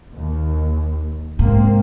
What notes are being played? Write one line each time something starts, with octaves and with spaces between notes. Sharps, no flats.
D#2
G#2 C3 A#3 C4